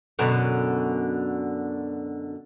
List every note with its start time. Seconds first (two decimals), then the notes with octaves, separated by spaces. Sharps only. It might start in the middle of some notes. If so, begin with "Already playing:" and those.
0.19 F#2 B2 D3